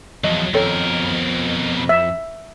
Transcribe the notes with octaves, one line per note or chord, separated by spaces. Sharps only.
E2 F3 F#3 D#5
F2 B2 C4 A4 A#4 C#5
E5